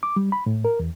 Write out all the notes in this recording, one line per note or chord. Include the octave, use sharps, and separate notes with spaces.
D6
G3
B5
A2
A#4
E2